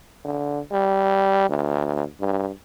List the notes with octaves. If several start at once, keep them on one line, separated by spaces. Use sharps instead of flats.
D3
G3
D2
G2